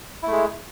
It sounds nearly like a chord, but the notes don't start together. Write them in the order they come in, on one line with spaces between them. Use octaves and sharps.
E4 A3 G#3